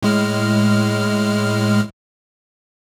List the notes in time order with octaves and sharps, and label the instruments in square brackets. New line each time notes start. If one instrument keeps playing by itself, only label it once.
[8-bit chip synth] A2 G#3 F6